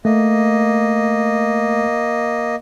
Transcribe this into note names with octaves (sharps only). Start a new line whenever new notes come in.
A3 A#3 D#5